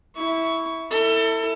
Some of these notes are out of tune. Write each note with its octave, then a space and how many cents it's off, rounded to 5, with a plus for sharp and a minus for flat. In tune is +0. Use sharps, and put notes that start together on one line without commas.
E4 -10 C#6 +15
E4 -10 A4 +30